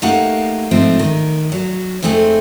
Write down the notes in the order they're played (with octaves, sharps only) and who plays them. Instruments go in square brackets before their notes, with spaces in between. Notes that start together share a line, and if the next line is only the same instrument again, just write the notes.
[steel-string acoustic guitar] A3 A#3 D#4 G4 F5 F#5
G#2 F3 A3 C4
D#3
F#3
F2 G#2 A3 C4 G4 G#4